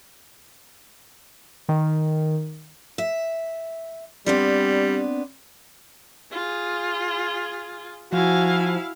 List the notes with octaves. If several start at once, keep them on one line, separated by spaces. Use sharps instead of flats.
D#3
E5
G3 B3 C4 D4
F4 G#4
F3 E4 F#4 F5 G#5